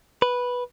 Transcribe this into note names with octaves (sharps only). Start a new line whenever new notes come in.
B4